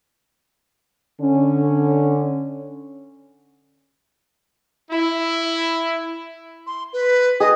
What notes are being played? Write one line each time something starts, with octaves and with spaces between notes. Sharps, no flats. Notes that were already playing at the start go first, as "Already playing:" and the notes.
D3 C#4
E4
C6
B4
G#4 D#5